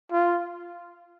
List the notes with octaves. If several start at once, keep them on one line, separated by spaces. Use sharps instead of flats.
F4